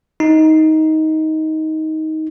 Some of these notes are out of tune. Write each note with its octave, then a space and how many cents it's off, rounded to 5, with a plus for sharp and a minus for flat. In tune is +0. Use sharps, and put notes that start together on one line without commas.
D#4 +15